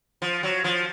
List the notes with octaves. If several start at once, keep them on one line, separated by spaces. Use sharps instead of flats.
F3
F#3
F3